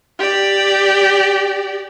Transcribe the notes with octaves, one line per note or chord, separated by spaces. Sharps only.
G4 D5